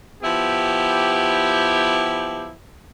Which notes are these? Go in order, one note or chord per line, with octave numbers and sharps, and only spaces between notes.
F3 B3 E4 G4